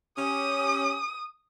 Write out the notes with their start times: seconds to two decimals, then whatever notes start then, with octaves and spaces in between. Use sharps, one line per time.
0.18 C#4 G4 D#6